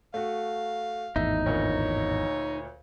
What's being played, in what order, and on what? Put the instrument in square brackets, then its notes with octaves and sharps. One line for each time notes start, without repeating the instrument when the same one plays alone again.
[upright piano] A3 F#4 [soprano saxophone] F5
[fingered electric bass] G#1 E2 A2 [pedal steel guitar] D#4 [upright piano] E5
[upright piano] D2 A#2 A#4 [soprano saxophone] C#5